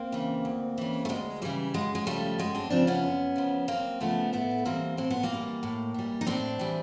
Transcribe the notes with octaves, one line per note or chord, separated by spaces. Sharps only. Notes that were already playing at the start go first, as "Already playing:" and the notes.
Already playing: A#3 C4
C#3 E3
D2
C#3 E3
A3
D2 G#3
C#3 E3 G3
F#2 G#3
G#3
C#3 F3 G3 A3
F#2 G#3
C4 D4
C#3 F3 C4 D4
B3 C#4
F#2
C#3 F3
F#2 A#3 C4
C#3 F3 A3 B3
A2 A3 B3
E3 G3 A#3 C4
A2 C4
B3
A#3 C4
E3 G3
A2
E3 G3
D#4
A2 C4 D4
E3 G3